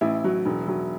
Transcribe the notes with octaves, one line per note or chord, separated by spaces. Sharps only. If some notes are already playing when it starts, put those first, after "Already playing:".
A1 E4
F#3
E1
F#3